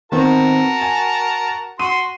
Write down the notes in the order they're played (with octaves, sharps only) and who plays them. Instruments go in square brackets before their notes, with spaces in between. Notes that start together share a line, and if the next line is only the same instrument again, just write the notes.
[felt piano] D#3 B3 C4 [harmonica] F#4 A#4 A5
[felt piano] G#5
[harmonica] F#4 C6 [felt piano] D#7